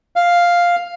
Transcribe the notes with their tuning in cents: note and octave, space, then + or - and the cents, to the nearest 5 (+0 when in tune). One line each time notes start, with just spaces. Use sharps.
F5 +0